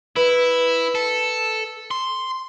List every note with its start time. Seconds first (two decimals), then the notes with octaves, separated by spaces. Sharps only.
0.16 E4 B4
0.95 A4
1.91 C6